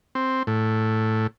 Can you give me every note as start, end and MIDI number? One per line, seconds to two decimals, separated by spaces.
0.15 0.43 60
0.47 1.27 45